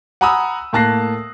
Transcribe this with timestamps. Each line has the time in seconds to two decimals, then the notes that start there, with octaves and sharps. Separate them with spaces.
0.21 F#5 G#5 A#5 B5 D#6 E6
0.73 A2 A#3 A5 F#6 A#6 C7